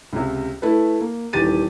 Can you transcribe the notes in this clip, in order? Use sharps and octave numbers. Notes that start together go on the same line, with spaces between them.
C#2 C3
A3 E4 A4 B4
A#3
D#1 D#3 E3 G4 A6 D#7